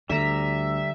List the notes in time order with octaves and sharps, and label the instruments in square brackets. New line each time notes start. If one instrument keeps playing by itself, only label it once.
[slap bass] D2 [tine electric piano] D3 [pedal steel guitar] G3 A#5 [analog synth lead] E5